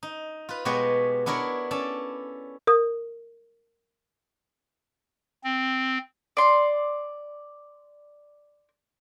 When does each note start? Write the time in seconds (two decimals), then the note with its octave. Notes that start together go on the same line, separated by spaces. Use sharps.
0.03 D#4
0.49 F4 B4
0.65 B2 G#3 B3 G4 B4 C#5
1.26 B3 D4 E4 A#4 C#5
1.71 C#4 A4 D5 A5
2.67 A#4 D#6
5.44 C4
6.37 D5 C6